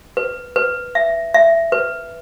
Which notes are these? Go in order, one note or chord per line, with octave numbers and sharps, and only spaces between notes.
B4
B4
E5
E5
B4